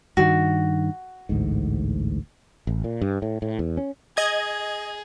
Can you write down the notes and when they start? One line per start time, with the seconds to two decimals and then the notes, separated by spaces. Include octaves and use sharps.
0.17 G2 D#3 F#4
1.29 A1 D2 G#2
2.67 A1
2.84 A#2
3.01 G2
3.22 A2
3.42 A2
3.59 E2
3.77 C#4
4.17 G#4 D#5 G#6